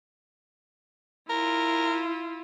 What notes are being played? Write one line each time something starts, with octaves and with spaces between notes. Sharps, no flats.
E4 F4 A#4